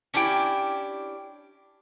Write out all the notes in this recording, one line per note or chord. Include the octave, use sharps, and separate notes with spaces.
C#4 D4 E4 G4 G5